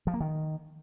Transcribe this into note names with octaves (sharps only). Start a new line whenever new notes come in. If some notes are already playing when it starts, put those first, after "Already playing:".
F3
A#3
D#3